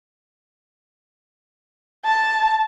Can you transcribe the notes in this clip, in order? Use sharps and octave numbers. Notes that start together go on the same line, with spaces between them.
A5